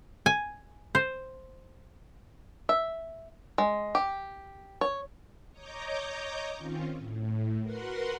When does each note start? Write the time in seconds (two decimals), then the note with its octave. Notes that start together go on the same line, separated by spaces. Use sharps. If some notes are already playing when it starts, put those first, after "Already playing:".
0.26 G#5
0.95 C5
2.69 E5
3.58 G#3
3.95 G4
4.81 C#5
5.51 C#5 D#5 A#5 D6 G6
6.57 D#3 C4 C#4 F4
6.96 A2
7.62 F#4 A#4 B4 F#5 C6 F#6